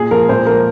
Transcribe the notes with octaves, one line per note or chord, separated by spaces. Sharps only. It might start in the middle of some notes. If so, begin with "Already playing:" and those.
Already playing: A#2 G#4
F3 A#4
A#2 C5
F3 A#4